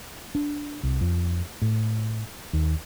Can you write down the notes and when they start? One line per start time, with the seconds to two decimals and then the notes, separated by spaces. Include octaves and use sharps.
0.35 D4
0.83 C2
1.01 F2
1.62 A2
2.53 D#2